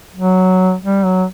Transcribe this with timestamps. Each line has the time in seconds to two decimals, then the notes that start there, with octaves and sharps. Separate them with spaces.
0.16 F#3
0.83 G3
1.05 F#3